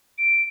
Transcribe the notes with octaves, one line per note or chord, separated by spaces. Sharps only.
D7